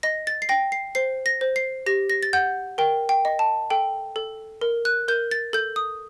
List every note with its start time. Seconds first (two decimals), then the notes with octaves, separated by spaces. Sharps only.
0.03 D#5 A#6
0.27 A6
0.42 C7
0.49 G5 A#6
0.72 C7
0.95 C5 C7
1.26 A#6
1.41 C5
1.56 C7
1.86 G4 A#6
2.10 A#6
2.23 A6
2.33 F#5 G6
2.78 A#4 G5
3.09 G5
3.25 D#5
3.39 A5
3.70 A4 G5
4.16 A4
4.61 A#4
4.85 F#6
5.08 A#4 G6
5.31 A6
5.53 A4 G6
5.76 D#6